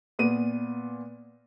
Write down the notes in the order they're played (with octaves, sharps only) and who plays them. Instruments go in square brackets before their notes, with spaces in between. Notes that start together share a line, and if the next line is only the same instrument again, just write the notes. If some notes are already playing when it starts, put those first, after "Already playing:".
[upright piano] A#2 B3 D#7